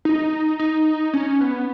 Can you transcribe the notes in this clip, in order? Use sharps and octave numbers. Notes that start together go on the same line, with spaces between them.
D#4
D#4
C#4
B3